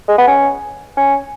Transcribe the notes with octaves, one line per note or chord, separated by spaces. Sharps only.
G#3
B3
C#4
C#4